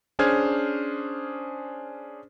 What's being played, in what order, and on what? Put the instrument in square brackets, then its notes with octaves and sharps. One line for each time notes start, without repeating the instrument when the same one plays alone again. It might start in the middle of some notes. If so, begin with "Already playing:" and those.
[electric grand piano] C#4 D4 G#4 C5 F6 G#6